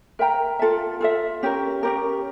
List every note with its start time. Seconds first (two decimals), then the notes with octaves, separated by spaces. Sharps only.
0.19 A#4 E5 G5 A#5
0.59 F4 A4 E5
1.01 F4 A4 E5
1.43 C#4 G4 A#4
1.83 C#4 G4 A#4